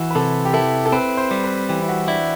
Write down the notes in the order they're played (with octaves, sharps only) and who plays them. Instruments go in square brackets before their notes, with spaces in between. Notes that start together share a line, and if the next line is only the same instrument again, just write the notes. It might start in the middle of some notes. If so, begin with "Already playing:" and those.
Already playing: [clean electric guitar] E3 [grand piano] E4 F#4
[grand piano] B4
[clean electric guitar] C3 [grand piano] A4
[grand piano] G4
[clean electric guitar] E4 [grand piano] A4
[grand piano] A4
[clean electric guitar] C4 [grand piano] B4
[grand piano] C5
[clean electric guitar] G3
[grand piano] B4
[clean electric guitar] E3 [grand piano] G4
[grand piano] E4
F#4
[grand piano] D4 [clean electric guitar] E4